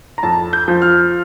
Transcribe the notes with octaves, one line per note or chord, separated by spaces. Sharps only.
A#5
F2 A5
G6
F3
F6